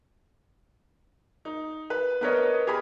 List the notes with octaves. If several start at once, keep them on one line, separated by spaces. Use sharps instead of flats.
D#4
B4
B3 D4 A#4 B4 C#5 D#5
G4 G#4 A#4 B5